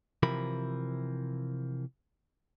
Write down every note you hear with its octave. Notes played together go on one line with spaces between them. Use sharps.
C3 E3 F3 A#4 B5